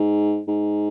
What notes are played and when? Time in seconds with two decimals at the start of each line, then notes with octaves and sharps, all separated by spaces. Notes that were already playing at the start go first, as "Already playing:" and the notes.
Already playing: G#2
0.48 G#2